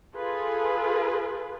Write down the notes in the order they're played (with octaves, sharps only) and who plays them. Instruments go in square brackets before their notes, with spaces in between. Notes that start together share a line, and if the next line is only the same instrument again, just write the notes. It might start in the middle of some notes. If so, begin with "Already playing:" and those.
[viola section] F4 G#4 A4 B4